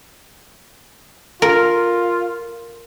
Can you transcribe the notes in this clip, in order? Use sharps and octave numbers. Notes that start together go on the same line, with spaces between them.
F4 A#4